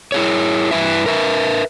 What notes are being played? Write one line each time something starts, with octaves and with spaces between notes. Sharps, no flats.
E4 G#4 C#5
G2 E4 B4 E5
A#4 B4 E5